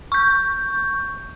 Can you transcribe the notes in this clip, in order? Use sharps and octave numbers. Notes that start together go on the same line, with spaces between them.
C#6 G6